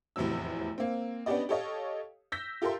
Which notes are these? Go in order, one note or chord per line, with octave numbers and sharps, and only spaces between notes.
F1 E2 A2 C3 F#3 E6
A#3 C4
B3 C#4 D4 G4 D5 D#5
G4 A4 C#5 D#5 F5
E6 G6 A#6 B6
F4 G4 A4 A#4 E5 C6